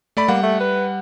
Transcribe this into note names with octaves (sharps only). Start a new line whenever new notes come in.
A3 D5 B5
G3 A#3 F#5
A3
B4